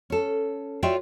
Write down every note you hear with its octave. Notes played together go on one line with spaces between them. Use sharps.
C#4 A4
F4 F#4 C#5 D5 E5 G5